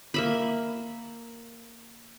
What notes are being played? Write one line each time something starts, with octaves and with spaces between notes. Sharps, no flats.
A#3 E5 B5